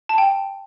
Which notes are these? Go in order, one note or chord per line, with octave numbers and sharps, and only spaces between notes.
A5
G5